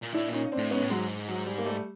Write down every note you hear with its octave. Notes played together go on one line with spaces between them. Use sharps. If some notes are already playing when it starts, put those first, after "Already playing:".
A#2
A2 D4 E4
A#2 C#4 D#4
C4 D4
A2
G#2 B3 C#4
A2
G#2 F#3 G#3
F#3
G3
A#3
G3 A3